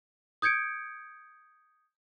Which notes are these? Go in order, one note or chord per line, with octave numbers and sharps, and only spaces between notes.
D#6 G6 G#6 C#7 D7